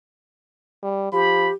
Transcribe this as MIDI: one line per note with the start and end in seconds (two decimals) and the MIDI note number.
0.83 1.10 55
1.13 1.49 53
1.13 1.53 67
1.13 1.50 83